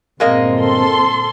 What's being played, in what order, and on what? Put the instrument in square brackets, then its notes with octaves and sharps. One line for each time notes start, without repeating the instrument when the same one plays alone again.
[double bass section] G1 A#2 C4 [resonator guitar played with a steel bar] G#3 A#3 D#5
[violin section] A4 C6